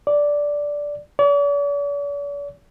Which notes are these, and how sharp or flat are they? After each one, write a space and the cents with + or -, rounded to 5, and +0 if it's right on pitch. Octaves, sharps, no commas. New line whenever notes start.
D5 -5
D5 -45